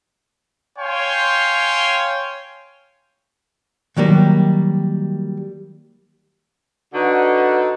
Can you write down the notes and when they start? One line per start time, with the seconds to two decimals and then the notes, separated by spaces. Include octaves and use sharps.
0.79 C#5 F5 G5 G#5 C6
3.97 D#3 F#3 G3 A#3
6.94 D3 D#4 F#4 B4